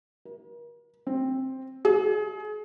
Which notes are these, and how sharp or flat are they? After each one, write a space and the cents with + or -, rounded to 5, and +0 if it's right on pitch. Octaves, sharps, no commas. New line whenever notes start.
A#4 +40
C4 +5
G#4 +35